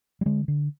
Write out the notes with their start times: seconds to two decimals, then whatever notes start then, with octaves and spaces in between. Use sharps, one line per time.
0.21 G3
0.26 D3 G#3
0.48 D3